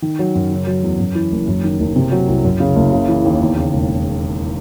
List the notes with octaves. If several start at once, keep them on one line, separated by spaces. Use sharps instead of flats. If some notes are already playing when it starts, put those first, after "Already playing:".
D#3
F#3
F#2
C#3
F#3
E2
F#2
E3
F#1
F#2
D#3
F#1
C3
F#3
C2
F#2
C#3
F#1
C#3
E3
D#2
E2
C#3
E1